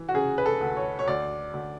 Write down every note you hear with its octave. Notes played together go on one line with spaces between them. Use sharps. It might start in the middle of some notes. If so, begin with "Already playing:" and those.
Already playing: E3
F#4
C#3 G#4
B4
A4
D2
C#5
C#5
D2 D5
D2